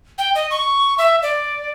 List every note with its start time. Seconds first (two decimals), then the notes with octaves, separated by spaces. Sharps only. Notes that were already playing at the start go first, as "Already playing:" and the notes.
0.18 G5
0.35 D#5
0.51 C#6
0.98 E5
1.22 D5